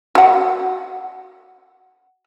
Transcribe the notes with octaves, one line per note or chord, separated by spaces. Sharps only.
F#4 F#5